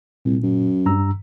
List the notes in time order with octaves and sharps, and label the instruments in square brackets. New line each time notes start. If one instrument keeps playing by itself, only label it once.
[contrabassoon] C2 [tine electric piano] A#2
[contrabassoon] F#2
[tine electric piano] G2 A#5 E6